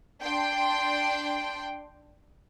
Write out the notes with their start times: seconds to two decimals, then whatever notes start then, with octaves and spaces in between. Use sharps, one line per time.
0.22 D4 G5 C6